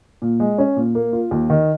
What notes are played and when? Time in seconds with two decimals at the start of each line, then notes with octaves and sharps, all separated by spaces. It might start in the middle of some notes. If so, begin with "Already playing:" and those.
0.22 A#2
0.40 G#3
0.58 C#4
0.76 A#2
0.95 A#3
1.13 F4
1.31 D#2
1.50 D#3